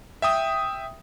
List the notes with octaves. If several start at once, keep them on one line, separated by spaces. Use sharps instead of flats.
E5 G5 D#6